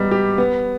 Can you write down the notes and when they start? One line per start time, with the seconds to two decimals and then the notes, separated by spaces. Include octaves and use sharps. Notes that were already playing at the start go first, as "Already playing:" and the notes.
Already playing: G3 B3 D#4
0.11 G4
0.38 B3